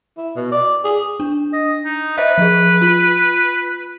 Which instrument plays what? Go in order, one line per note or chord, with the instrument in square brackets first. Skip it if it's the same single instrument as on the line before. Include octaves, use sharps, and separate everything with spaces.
[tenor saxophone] E4
B2
D5
G#4
[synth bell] D4
[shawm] D#5
D#4
[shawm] B4 [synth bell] C5 D#5 E5
[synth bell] F3 G#4
F4